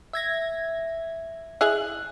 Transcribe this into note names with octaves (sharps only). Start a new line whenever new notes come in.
E5 G#6 A#6
E4 G#4 D#5 F#6